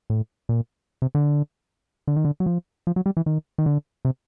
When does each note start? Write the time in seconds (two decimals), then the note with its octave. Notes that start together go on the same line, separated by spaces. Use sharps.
0.10 A2
0.49 A#2
1.02 C3
1.15 D3
2.08 D3
2.16 D#3
2.25 D3
2.40 F#3
2.46 F3
2.87 F3
2.96 F#3
3.06 G3
3.17 E3
3.26 D#3
3.58 D#3
3.66 D3
4.05 C3